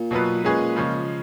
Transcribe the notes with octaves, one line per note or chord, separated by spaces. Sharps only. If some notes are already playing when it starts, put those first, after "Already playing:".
Already playing: A#2
B2 F#3 B3 F4 B4
A#2 G#3 C#4 G#4 B4
C#3 F3 G#3 C#4